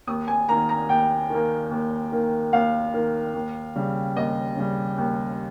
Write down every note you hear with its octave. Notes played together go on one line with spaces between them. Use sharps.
D#2 D#6
G#5
D#3 A#3 A#5
A#5
D#2 G5
D#3 A#3
D#2
D#3 A#3
D#2 F5
D#3 A#3
D#2
C#3 G3
D#2 D#5
C#3 G3
D#2